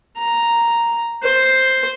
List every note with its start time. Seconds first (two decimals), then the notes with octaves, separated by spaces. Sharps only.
0.17 A#5
1.23 C5